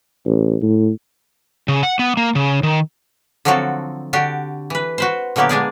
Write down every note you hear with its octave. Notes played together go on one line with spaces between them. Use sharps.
A1
A2
C#3
F#5
B3
A#3
C#3
D#3
D3 F3 F#3 C4 F#4 A4
D3 D4 F#4 G4
E3 B4
F#4 B4 C5
A#2 D3 F#3 A#3 B3 G4
G#3 D4 G#4 D5